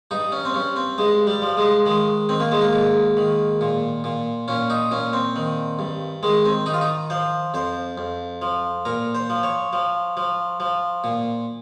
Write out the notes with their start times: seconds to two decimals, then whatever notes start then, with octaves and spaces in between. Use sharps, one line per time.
0.11 G2 D#4
0.32 C#4
0.45 C4
0.54 G2 C#4
0.76 C4
0.98 G2 G#3
1.27 G3
1.42 F3
1.57 G#3
1.86 D#3 G#3
2.29 D#3 C4
2.40 A#3
2.52 G#3
2.61 A#3
2.73 G#2
3.17 D#3
3.61 A#2
4.04 A#2
4.48 A#2 C#4
4.70 D#4
4.91 A#2 C#4
5.13 C4
5.36 D#3
5.79 G2
6.23 D#3 G#3
6.45 C4
6.66 D#3 D#4
6.74 F4
6.81 D#4
7.10 F3 C5
7.54 F2 C5
7.98 F2
8.42 F3
8.85 A#2 A#4
9.15 C5
9.30 F3
9.43 C#5
9.73 F3
10.17 F3
10.60 F3
11.04 A#2